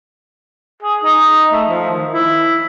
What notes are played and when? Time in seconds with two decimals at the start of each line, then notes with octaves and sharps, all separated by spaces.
0.83 G#4
1.04 D#4
1.53 A3
1.69 F3
1.90 D#3
2.13 E4